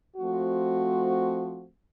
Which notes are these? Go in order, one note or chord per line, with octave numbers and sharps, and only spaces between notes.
F3 A3 C4 F#4